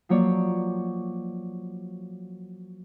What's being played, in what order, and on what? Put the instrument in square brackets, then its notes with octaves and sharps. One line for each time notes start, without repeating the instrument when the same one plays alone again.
[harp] F3 F#3 A#3 C#5 D5